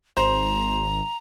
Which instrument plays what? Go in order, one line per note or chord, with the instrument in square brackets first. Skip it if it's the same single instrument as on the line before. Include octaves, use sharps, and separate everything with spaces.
[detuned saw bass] G#1 [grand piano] C5 [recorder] A#5